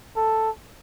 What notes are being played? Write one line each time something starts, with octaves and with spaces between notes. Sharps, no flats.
A4